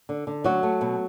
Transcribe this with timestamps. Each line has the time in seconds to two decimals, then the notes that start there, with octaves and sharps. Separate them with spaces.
0.09 D3
0.27 D3
0.44 F#3 A3 F#4
0.63 A3
0.81 B2